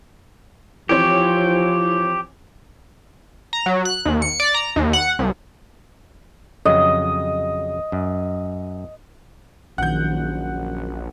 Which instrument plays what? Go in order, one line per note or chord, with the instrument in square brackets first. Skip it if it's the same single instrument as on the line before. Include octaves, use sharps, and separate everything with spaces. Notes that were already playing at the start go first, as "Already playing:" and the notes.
[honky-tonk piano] E3 C4 C#5 [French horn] F3 [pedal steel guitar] G4
[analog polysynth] A#5
F#3
F#6
D#2
C#7
D5
A#5
D#2
F#5
C2
[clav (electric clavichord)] F2 C#3 F#3 [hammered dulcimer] D#5
[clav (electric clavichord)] F#2
[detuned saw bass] A#1 [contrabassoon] F#2 [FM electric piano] D#3 F#6 [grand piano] F#5 G6